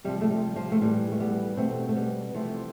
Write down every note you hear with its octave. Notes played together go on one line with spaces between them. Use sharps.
C3 F3 G3
A3
G3
F3
A3
A2 E3 G3
A3
G3 B3
B2 A3 C4
A3
G3 B3
C3 E3 F3 A3